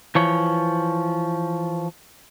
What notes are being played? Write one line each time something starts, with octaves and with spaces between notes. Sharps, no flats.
E3 F3 C#5